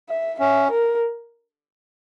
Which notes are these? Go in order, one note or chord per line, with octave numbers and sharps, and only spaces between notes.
E5
C#4 E5
A#4